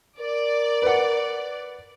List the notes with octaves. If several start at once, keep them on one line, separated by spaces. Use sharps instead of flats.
A#4 D5
B4 F#5